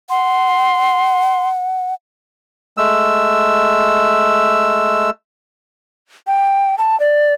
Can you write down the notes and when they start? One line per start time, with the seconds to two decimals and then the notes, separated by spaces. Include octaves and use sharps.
0.10 F#5 C6
2.77 G#3 A3 E6
6.27 G5
6.78 A5
7.00 D5